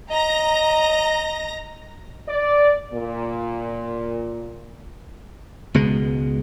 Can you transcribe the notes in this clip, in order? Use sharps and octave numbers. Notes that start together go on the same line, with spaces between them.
D#5 A#5 A#6
D5
A#2
C#2 B2 G#3